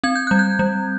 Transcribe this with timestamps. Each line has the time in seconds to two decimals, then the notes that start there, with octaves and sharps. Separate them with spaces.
0.04 C4 G#6
0.15 G6
0.27 G3 F#6
0.39 G6
0.59 G3